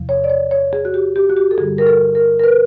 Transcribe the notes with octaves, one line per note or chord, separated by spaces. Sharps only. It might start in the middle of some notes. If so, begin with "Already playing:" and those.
Already playing: E2 C3 F3
C#5
D5
C#5
C#5
G#4
F#4
G4
G4
F#4
G4
A4
G2 D3 G3 G#4
A#4
A4
A#4
A#4
B4